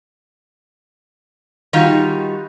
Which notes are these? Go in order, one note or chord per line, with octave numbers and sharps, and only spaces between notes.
D#3 G3 D#4 F4 F#4